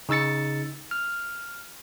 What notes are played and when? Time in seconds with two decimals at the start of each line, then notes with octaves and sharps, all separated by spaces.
0.09 C#3 D#4 E6 A6 C#7
0.91 F6